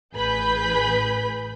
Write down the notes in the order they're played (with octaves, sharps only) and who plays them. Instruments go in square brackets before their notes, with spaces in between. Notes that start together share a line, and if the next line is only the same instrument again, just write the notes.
[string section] A1 G#4 B4 B5 G6 B6